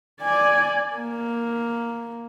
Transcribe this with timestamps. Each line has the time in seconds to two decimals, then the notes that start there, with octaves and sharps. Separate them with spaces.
0.21 D5 G#5
0.96 A#3